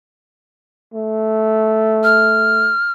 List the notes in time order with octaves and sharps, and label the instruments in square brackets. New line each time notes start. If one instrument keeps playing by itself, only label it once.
[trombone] A3
[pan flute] F6